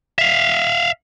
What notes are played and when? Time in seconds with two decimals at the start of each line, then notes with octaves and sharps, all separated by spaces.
0.19 E5 F5